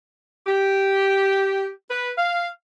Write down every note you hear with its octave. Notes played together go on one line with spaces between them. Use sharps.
G4
B4
F5